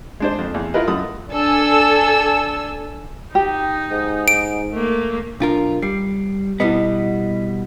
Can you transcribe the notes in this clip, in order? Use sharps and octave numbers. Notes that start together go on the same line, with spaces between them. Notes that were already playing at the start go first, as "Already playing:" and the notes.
G#3 D4 C5
F2
E2
E4 F4 A#4 B4 D#5
F#2 A3 D#6
D4 A4 G#5 E6
D#4 G4
G#2
D7
A3 A#3
B1 D4 F4 A#4
G3 C7
B2 G3 B3 E4 D#5